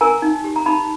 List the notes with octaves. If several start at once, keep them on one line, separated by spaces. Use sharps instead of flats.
A#4 G#5 A#5
D#4
G4
A#5
D#4 A5 B5